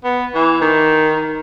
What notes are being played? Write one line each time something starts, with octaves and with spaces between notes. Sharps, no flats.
B3
E3
D#3